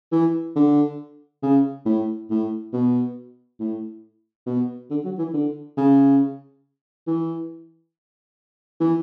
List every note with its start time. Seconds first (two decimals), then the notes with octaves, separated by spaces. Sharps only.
0.12 E3
0.56 D3
1.43 C#3
1.86 A2
2.30 A2
2.73 B2
3.60 A2
4.46 B2
4.90 D3
5.05 F#3
5.18 E3
5.34 D3
5.77 C#3
7.07 E3
8.80 E3